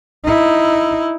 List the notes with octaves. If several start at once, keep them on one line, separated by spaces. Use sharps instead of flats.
D#4 E4